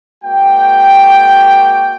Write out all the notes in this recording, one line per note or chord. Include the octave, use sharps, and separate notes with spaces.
G#3 A#3 F#4 D5 G5